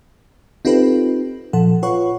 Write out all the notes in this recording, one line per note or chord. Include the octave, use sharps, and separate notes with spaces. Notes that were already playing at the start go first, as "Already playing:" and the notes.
C4 D#4 F4 G4 A4 B4
A#2 F3 A4 F#5
F4 B4 C#5 F#5 C#6